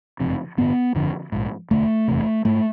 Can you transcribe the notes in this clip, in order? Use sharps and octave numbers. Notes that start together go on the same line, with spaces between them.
F#1 F2 C3
A1 G2 D3 B3
G1 F2 D3
A#1 G#2
E1 D2 D3 A3
F#1 E2 C3
G#2 A3